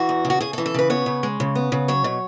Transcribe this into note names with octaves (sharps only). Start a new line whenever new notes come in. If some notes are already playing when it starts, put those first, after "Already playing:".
Already playing: E3 F#4
E2
C#3
F#4
C#3 G#4
A4
E3
A4
C#3 B4
B3 C#5
C#3
G#3
C#3
B3
C#3
F#3 C#5
B2